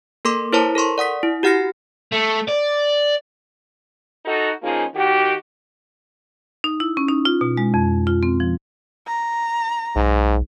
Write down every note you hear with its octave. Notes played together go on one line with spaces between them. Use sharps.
A#3 A4 A#4 C6 D6
E4 A#4 C5 C#5 A5 A#5
A4 A#4 C6 C#6
D5 F#5 D#6 B6
E4
F#4 G4 F#5 F6 A#6 C#7
A3
D5
D#4 F#4 A4
F3 A#3 C#4 D#4 F4 G#4
D#3 F#4 G4
D#4
E4
C#4
D#4
F4
B2
G#3
F2
F4
C4
F3
A#5
B1 G#2